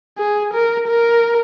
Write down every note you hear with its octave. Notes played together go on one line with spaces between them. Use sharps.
G#4
A#4
A#4